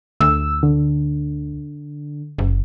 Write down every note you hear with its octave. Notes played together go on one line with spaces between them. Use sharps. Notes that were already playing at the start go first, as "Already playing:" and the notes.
D2 E6
D3
F#1